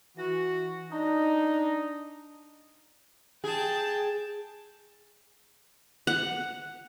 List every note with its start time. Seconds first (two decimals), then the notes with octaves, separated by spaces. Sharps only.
0.17 E3 F#4
0.91 D4 D#4
3.44 G#4 G5 A5
6.07 F#5